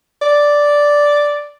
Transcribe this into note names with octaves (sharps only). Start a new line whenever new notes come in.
D5